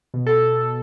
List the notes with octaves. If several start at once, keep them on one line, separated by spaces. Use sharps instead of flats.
B2
A4